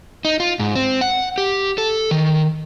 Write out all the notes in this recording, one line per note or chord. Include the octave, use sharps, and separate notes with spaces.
D#4
F4
G#2
C4
F#5
G4
A4
D#3